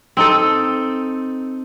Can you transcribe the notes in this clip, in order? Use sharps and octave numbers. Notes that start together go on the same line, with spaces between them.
C4 D#4 A4